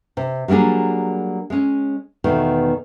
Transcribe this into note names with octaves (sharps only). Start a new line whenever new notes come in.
C3
F#3 G3 A#3 D4 G#4
G#3 C#4
E2 B2 D#3 A3